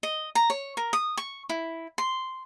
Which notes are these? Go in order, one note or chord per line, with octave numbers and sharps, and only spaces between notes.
D#5
A#5
C#5
A#4
D#6
C#6
E4
C6